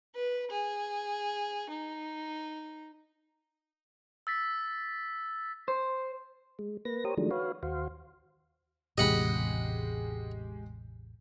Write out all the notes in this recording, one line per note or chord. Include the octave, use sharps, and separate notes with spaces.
B4
G#4
D#4
E6 A6 B6
C5
G#3
A#3 B4 A#6
G4 A#4 C5 C#5 D#6
D#3 F3 F#3 G#3 A3 D4
F#4 B4 C#5 F5
D#2 F#4 C5 F5
A1 E2 C3 G#3 G4 D#5 F#5 B5